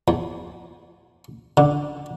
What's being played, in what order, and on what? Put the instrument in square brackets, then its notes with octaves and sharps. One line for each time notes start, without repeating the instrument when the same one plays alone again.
[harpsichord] E2
D3